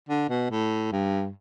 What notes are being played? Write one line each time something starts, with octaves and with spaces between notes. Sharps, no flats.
D3
B2
A2
G2